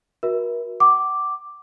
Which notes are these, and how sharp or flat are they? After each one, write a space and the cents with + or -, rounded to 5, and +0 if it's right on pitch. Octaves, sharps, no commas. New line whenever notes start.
F#4 -15 A#4 +40 E5 -20
F#5 +35 D6 +0